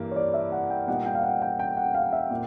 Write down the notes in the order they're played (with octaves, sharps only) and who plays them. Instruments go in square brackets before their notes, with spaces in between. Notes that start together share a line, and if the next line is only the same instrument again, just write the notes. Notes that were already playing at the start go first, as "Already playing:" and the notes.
Already playing: [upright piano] G2 E3 G3 A#3
[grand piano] C#5
D5
E5
F#5
G5
[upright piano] A#2 G3 B3 D#4 [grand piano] F#5
[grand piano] G5
F5
F#5
G5
G5
F#5
F5
E5
[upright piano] A#2